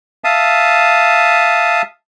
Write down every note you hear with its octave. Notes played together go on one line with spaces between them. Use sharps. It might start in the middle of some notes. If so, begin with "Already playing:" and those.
E5 F5 A5 D#6